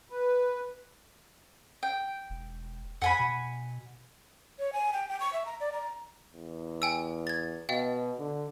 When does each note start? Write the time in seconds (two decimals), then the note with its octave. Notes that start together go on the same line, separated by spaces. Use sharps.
0.10 B4
1.83 G5
2.30 E1
3.02 F2 F#5 G#5 B5
3.19 B2
4.59 C#5
4.73 G#5
4.93 G5
5.09 G5
5.20 C#6
5.33 E5
5.46 A#5
5.60 D5
5.73 A#5
6.33 E2
6.82 G5 G#5 E6
7.27 G#6 A6
7.69 B2 D#5 F5 G5
8.19 D3